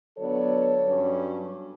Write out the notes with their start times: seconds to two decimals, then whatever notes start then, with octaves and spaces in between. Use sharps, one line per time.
0.18 D3 F#3 B3 D4 A4 C#5
0.86 G2 F#3 C#4